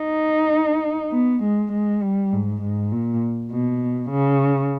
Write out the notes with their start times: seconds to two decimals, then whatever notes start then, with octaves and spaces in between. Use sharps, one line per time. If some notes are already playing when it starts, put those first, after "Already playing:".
Already playing: D#4
1.12 B3
1.43 G#3
1.72 G#3
2.02 G3
2.33 G#2
2.62 G#2
2.92 A#2
3.51 B2
4.10 C#3